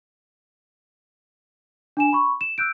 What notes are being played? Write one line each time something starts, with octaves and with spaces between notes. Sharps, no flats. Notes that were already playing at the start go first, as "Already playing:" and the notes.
D4 G#5 E7
B5 C#6
E7
E6 F#6 G6 D7